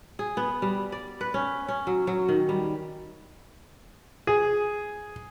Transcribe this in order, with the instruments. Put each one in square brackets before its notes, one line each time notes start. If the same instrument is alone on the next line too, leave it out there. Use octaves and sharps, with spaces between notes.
[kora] G#4
B3
G3
D5
B4
C#4
C#4
F#3
F#3
D#3
G3
[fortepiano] G#4